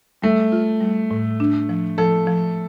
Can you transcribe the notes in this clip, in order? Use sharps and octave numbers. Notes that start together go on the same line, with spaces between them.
G3 A3
F4
G3
A2
D4
F3
F3 A4
F3